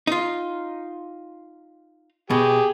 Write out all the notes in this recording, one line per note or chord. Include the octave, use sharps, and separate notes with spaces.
D#4 F4
B2 G4 G#4